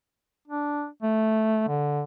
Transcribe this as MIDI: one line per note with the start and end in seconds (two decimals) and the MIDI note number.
0.48 0.87 62
1.03 1.65 57
1.68 2.02 50